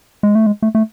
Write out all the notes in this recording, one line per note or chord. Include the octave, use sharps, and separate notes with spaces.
G#3
A3
G#3
A3
A3